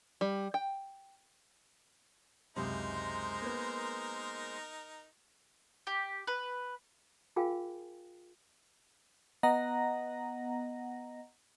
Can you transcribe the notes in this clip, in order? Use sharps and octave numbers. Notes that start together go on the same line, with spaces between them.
G3
G5
C#2 F#2 C3 G#3 D#4 A#4 C5 C6
A#3 B3
G4
B4
F4 G#4 A#4 F5 G5 G#5
B3 D#5 F#5 A#5 A#6